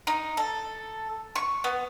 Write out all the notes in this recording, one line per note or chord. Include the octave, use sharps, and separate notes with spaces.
D#4
A4
C#6
B3